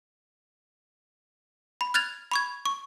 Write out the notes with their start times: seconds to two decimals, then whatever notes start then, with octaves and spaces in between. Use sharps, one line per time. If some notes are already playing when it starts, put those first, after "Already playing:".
1.81 B5
1.94 F6 F#6 G#6 A6 F7
2.31 B5 C#6 G#6
2.65 C#6